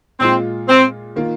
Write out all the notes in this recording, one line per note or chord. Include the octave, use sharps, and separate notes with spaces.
A#2 G#3 C4 F4
C4
D#3 A#3 F4